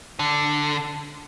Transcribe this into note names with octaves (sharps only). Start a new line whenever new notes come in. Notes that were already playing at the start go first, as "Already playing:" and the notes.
D3